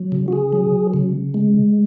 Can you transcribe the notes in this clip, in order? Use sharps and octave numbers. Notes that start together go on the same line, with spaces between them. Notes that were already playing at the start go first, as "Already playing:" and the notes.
Already playing: F#3
C#3
F#4
G#4
F#3
C#3
G#3